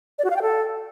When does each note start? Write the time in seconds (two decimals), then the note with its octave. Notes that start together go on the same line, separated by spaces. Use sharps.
0.19 D5
0.24 F#4
0.30 F5
0.36 G5
0.42 A4